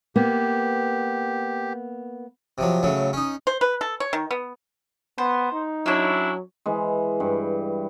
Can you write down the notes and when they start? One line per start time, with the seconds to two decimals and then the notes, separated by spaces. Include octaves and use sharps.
0.16 A#3 B3 G4
2.58 C3 F3 F#3
2.83 A2 C#3 F#3
3.13 C#4 D#4
3.47 C5
3.61 B4
3.81 A4
4.00 C#5
4.13 D#3
4.31 B3
5.18 B3 C5
5.53 D#4
5.86 F#3 C#4 D4 E4 C#5
6.66 E3 G#3
7.20 G2